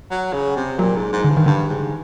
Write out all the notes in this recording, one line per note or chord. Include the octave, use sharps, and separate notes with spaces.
F#3
C#3
C3
A#2 F#3
G#2
G#2
G2 D3
D#3
G2 D3
G#2